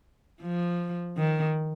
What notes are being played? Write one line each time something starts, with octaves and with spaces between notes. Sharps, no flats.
F3
D#3